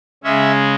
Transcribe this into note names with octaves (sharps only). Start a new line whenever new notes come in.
C#3 G#3 C#4 E5